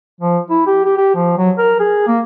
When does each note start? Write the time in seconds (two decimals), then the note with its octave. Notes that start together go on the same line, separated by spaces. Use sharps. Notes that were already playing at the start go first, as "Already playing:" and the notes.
0.21 F3
0.50 E4
0.67 G4
0.85 G4
0.97 G4
1.15 F3
1.38 F#3
1.58 A#4
1.80 G#4
2.07 A#3